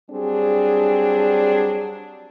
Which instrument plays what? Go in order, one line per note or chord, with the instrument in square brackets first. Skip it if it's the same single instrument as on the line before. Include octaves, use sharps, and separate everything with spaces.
[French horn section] F#3 G3 C4 D4 G#4